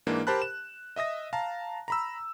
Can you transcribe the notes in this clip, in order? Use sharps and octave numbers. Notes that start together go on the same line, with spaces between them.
G#2 E3 A#3 D4
G4 A#4 C5 A5 B5 F#6
E7
D#5 E5 D#6 A#6
F5 A5 A#5
A#5 B5 E6